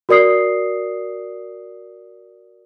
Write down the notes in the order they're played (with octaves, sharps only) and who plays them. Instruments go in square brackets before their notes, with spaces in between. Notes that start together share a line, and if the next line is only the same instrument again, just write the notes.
[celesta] F#4 A#4 D5 D#6 C7